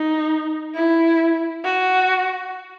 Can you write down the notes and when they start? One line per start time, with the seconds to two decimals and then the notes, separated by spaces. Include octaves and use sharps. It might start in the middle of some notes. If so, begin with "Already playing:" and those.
Already playing: D#4
0.75 E4
1.64 F#4